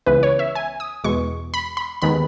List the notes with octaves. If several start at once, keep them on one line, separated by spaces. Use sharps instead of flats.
C#2 C#3 E3 B3 B4
C#5
E5
G#5
D#6
E2 B2 G#3 C#6
B5
B5
D#2 D#3 G#3 B3 B5